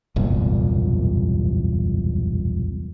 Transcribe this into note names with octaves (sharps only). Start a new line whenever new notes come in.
E1 C2 F#2 A#2